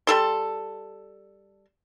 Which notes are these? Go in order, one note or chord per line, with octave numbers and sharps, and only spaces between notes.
G3 A4 C6